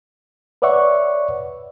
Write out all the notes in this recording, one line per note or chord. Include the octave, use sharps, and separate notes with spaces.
B4 C#5 D5 E5 F#5 C#6